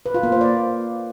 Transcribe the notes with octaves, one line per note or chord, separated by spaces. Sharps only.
B4
F4
A#3
C5
D5